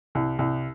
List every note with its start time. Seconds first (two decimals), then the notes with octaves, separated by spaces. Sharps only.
0.15 C2
0.39 C2